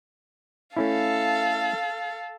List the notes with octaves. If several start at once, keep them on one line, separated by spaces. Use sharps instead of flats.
A3 C#4 E4 A4 F5